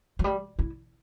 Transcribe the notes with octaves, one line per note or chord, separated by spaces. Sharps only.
F#3
G3
E4